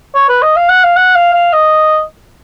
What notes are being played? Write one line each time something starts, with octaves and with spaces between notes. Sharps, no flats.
C#5
B4
D#5
F5
F#5
F5
F#5
F5
F5
D#5